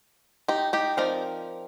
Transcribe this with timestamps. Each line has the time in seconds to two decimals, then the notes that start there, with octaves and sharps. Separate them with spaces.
0.48 D#4 G4
0.73 D#4 G4
0.97 F3 C4 D#4 A#4 D5